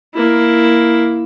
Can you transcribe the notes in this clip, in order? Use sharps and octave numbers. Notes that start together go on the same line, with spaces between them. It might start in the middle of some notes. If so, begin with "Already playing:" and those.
A#3 E4